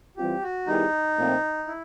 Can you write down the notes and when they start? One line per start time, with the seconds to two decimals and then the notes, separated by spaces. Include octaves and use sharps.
0.17 E3 G3 C4 F4 G4
0.42 F#4
0.67 D#3 G3 B3 D#4 E4 G#4
1.17 A#2 F3 A3 C4
1.67 E4